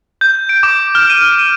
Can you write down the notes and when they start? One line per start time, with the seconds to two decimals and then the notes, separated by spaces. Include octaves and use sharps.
0.21 G6
0.49 D7
0.63 D6
0.95 F6
1.10 D#7
1.32 D#7